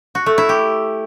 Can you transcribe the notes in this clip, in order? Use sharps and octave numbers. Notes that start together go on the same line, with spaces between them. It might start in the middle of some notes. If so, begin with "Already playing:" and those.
F#4
A3
E4
G4